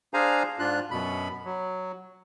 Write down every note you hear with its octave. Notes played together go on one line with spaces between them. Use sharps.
D4 G#4 C5 F5 G#5 A#5
G#2 D4 F4 F#6
F#2 B2 B5
F#3